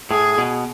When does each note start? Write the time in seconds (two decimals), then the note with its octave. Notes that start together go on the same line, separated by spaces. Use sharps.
0.11 A2 G#4
0.38 B2